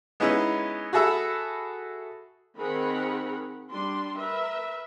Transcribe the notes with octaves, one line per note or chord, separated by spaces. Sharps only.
G#3 B3 C#4 D#4 E4
F#4 G#4 A4 E5 B5
D#3 C4 G#4 A#4 F#5 B5
G3 D4 C6
A#4 B4 E5